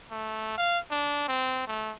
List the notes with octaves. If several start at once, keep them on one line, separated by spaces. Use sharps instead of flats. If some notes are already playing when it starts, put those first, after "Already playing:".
A3
F5
D4
C4
A3